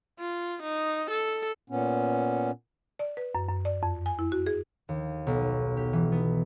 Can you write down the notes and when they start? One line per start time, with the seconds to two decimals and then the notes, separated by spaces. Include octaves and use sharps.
0.19 F4
0.62 D#4
1.10 A4
1.70 A#2 B3 C#4
2.99 D5
3.17 B4
3.35 F#2
3.49 F#2
3.65 D5
3.83 F2
4.06 G#5
4.19 E4
4.32 F#4
4.46 G#4
4.89 D#2
5.27 B1
5.77 G4
5.93 E3
6.12 B3